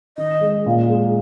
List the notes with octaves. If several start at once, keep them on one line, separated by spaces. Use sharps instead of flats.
D#3 D#5
G#3
A#2
G#3